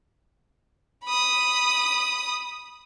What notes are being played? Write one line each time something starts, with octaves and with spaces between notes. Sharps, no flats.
B5 D#6